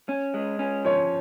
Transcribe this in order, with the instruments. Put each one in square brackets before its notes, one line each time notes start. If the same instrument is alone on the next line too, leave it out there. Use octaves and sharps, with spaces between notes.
[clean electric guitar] C#4
G#3
C#4
[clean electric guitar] F3 [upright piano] C#5